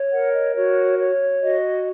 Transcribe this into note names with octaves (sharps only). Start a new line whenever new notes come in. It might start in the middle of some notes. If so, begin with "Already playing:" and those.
Already playing: C#5
A#4 F#5
D#5
F#4 C#5
C#5
F#4 D#5